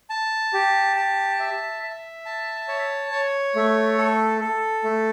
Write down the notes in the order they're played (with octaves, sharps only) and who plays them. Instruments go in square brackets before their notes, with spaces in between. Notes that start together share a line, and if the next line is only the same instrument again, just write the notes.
[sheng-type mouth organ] A5
G4
A5
E5
E5
A5
C#5
C#5
A3
A4
A4
A3